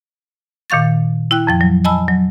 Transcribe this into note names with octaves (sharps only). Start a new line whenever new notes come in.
A#2 D#3 F5 C#6 A6
E4 G5 F#6
F2 F3 G5
F#3
D#5 G#5 A5 B5 E6
F#3